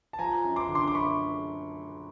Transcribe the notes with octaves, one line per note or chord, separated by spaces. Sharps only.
A5
F3 G#5 A#5
F#2
C6 D6
D3
C6 D6
D6
F#2 B5 C#6